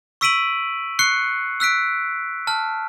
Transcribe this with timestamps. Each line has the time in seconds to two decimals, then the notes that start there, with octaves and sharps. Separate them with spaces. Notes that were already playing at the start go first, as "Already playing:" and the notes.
0.21 C#6 E6 B6 D7 D#7 F#7
0.99 C#6 F#6 C7 C#7
1.60 E6 F#6 B6 D7
2.47 A5 F6